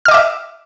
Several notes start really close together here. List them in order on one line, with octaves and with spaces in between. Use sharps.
F6 D#5 D6 E5